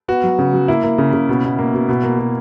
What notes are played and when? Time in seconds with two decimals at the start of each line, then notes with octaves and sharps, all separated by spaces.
0.08 B3 F#4
0.23 F#3
0.39 C#3
0.53 F#3
0.68 A#3 E4
0.84 A#3
0.98 C#3
1.13 C#3
1.29 B2
1.44 B2
1.59 A#3
1.74 B2
1.89 B2
2.03 A#3
2.19 B2